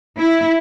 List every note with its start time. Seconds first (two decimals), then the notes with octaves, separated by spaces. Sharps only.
0.19 E4